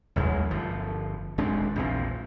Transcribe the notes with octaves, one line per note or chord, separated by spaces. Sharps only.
A1 D#2 F#3 G#3
G1 F3
D#1 G#3 C4 D4
A#1 E2 A#2 C4